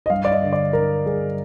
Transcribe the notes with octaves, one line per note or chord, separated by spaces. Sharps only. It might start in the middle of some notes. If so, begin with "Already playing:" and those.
D#5
G2 F5
D5
D#5
D3
D5
D3 A#4
G2 G#4